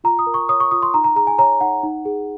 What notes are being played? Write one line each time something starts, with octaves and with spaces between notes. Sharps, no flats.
F4 A#5
D#6
A#4
C#6
C#5 D#6
C#6
F4 D#6
C6
D#4 A#5
A#5
G#4 A#5
G#5
C#5 A#5
D#4 F#5
D#4
G#4